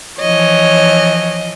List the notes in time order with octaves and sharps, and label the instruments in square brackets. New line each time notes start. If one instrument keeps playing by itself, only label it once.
[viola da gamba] E3 F3 [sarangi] C#5 [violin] D#5